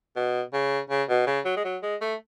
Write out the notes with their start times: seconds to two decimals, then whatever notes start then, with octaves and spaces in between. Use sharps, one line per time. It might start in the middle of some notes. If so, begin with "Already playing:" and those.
0.16 B2
0.53 C#3
0.90 C#3
1.09 B2
1.27 C#3
1.45 F#3
1.57 G#3
1.65 F#3
1.83 G#3
2.02 A3